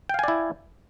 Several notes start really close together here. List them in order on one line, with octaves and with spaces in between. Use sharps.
G5 F5 G#5 D5 E4